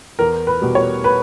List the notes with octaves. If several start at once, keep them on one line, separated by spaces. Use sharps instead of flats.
E2 A#4
B4
B2 G3
C#5
B4